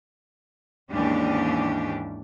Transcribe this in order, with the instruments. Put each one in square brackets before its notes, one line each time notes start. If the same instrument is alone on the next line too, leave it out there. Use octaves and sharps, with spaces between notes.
[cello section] D#2 G#2 E3 C#4 D4 G4